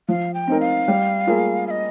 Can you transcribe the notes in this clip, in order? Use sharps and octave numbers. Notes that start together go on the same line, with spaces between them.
F3 F5
G5
C4 D#4 A#4
F5
G3
A#3 F4 G#4
F5
D#5